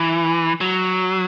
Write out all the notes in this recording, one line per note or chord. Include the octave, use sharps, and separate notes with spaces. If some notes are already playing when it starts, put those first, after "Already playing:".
Already playing: E3
F#3